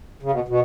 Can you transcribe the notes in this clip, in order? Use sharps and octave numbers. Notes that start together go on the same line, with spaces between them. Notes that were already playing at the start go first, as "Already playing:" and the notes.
C#3
B2
B2